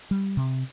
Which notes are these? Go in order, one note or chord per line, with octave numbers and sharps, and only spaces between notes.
G3
C3